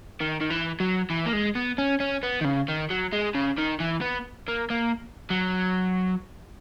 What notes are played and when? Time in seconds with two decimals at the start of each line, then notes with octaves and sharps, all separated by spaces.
0.20 D#3
0.41 D#3
0.50 E3
0.80 F#3
1.10 E3
1.26 A#3
1.33 G#3
1.55 B3
1.78 C#4
2.00 C#4
2.23 B3
2.41 D#3
2.45 C#3
2.68 D#3
2.90 F#3
3.12 G#3
3.34 C#3
3.58 D#3
3.80 E3
4.02 B3
4.48 A#3
4.70 A#3
5.30 F#3